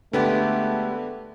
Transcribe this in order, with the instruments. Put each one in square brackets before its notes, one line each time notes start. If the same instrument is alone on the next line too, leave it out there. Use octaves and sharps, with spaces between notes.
[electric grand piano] D3 B4 [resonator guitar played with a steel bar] G#3 B3 G4 [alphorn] A3